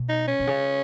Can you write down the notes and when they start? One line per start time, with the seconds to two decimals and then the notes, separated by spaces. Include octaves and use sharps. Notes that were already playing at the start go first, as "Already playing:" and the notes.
Already playing: B2
0.09 D#4
0.28 C#4
0.39 B2
0.47 C#3